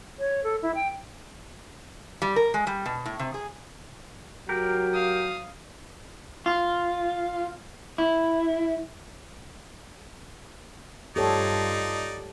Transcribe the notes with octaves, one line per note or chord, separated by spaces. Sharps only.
C#5
A4
E4
G5
G3
A#4
G#3
G3
B2
A2
C3
G#4
F#3 G4 A#4
F5 D#6
F4
E4
G2 D#4 F4 G4 A4 C#5 D5